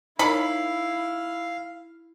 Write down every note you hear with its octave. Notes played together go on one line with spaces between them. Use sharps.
D#4 E4 A#4 C#5 F5 B5